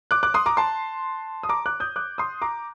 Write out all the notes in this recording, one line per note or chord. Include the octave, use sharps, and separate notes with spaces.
D6 F#6
D6 F#6
C6 D#6
A#5 D6
A5 C6
D#6
A#5 D6
D6 F#6
D#6 G6
D6 F#6
C6 D#6
A#5 D6